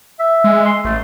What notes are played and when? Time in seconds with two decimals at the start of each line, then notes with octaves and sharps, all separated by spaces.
0.20 E5
0.44 G#3
0.65 C6
0.85 A1 A3